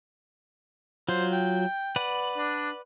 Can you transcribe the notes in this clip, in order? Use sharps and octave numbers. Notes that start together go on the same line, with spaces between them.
F#3 F4 C5
G5
B4 D5 F#5
D4